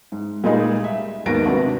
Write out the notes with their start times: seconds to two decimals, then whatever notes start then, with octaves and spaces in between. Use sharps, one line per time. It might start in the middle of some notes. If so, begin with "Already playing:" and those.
0.12 G#2
0.44 A#2 G3 G#3 A#3 D#4 G#4
0.84 E5
1.26 D#2 G#2 B2 D#3 A#6 D7
1.45 C3 D4 F#4 B4